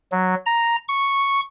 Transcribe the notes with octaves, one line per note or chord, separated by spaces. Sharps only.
F#3
A#5
C#6